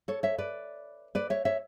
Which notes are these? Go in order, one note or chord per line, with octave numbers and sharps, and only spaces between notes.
A4 C#5
C#5 E5
B4 D5
B4 D5
C#5 E5
C#5 E5